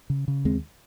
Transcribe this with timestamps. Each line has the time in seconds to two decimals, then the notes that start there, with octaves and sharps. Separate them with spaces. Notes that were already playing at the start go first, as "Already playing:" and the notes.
0.10 C#3
0.28 C#3
0.45 D#2 G#3 C4